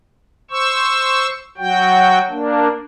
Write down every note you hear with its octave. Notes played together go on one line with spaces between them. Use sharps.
C5 C#6 E6
F#3 F#4 G5
A#3 D4